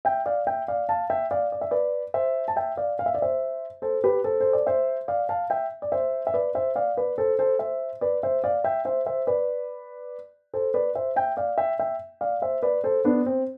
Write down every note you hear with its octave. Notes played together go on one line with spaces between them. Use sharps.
E5 G5
D5 F5
E5 G5
D5 F5
F5 A5
E5 G5
D5 F5
D5
E5
B4 D5
C5 E5
A5
E5 G5
D5 F5
F5
E5
D5
C5 E5
A4 C5
G4 B4
A4 C5
C5
D5
C5 E5
D5 F5
F5 A5
E5 G5
D5
C5 E5
E5
B4 D5
C5 E5
D5 F5
B4 D5
A4 C5
A4 C5
C5 E5
B4 D5
C5 E5
D5 F5
E5 G5
C5 E5
C5 E5
B4 D5
A4 C5
B4 D5
C5 E5
E5 G5
D5 F5
E5 G5
E5 G5
D5 F5
C5 E5
B4 D5
A4 C5
B3 D4
C4